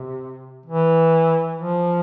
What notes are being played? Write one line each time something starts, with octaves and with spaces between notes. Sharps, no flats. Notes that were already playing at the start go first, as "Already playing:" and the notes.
Already playing: C3
E3
F3